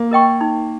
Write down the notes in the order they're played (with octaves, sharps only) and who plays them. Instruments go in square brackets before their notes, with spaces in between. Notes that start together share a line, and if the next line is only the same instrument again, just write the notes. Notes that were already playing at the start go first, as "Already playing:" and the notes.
Already playing: [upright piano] A#3
[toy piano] A#4 D#5 G5 C#6
D#4